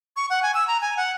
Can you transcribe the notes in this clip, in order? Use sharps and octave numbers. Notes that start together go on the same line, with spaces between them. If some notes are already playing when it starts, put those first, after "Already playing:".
C#6
F#5
G#5
E6
A#5
G#5
F#5